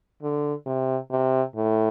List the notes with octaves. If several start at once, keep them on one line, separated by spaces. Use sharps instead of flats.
D3
C3
C3
A2